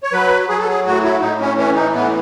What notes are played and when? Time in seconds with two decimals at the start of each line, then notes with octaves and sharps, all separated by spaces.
0.03 C#5
0.13 F#3 B4
0.49 F#3 G#4
0.58 A4
0.68 G#4
0.86 A2 F#4
1.04 E4
1.21 A2 D#4
1.40 C#4
1.58 E3 C#4
1.75 D#4
1.94 A2 B3